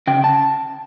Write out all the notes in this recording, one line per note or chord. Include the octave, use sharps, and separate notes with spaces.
C#3 G5
A5